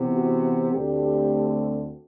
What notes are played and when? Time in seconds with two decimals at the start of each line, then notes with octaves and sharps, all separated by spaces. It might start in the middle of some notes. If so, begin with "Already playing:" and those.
Already playing: C3 E3 B3
0.13 F#4
0.70 D2 D3 A3 C4 G4